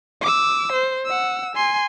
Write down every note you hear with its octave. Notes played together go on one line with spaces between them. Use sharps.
D6 E6
C5
F#5 E6
G#5 C6